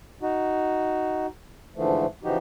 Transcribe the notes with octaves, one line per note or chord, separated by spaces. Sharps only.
D#4 F#4
G#2 D3 E3 F3 A3
C#3 E3 F3 D#4 F#4 G4